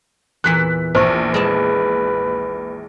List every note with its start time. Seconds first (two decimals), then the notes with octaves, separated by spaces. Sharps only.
0.44 E2 A#2 E3 F#6 B6
0.95 A#1 C5 C#6
1.34 G#3 G#4 B4 A5